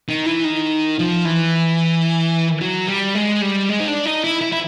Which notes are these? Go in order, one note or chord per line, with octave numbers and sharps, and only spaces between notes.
D#3
E3
D#3
F3
E3
F#3
G3
G#3
G3
G#3
D#4
D4
D#4
E4
E4
E4